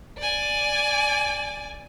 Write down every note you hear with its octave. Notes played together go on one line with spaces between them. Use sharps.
D5 G#5